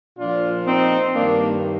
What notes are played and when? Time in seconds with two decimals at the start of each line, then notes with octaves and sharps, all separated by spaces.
0.18 A#2 F3 D4 F4
0.67 C4 D#4
1.15 G2 D#3 A#3 D4